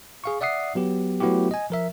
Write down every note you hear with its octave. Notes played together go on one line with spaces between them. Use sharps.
G#4 F5 C#6
D5 E5 F#5 D#6 C7
F#3 B3 G4
F#3 A3 B3 E4 F#4 G4
D#5 G#5
F3 A#4 E5